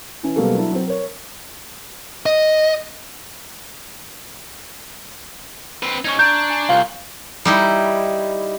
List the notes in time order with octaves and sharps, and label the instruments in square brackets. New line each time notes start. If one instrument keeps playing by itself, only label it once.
[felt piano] E3 C#4
B2 F#3 G3 A#3 G4 A4
F#3 D4 E4
F#3 C4
A#4 C#5
[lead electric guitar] D#5
[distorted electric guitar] C4 B4
[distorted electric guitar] C#4 D#4 [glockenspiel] C#6 G#6
[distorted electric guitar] D4 [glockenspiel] A#5 [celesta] G6
[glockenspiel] G#5 C#7
[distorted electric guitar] C2 [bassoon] F4 [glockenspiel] G6 F#7 G7
[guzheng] G3 D#4 E4